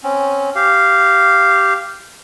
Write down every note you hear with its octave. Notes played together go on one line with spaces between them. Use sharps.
C4 C#4
G4 F5